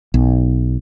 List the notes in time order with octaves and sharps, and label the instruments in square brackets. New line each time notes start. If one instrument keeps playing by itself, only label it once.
[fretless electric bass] B1